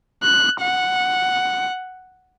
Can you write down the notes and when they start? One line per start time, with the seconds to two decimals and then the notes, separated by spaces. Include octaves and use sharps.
0.23 F#6
0.61 F#5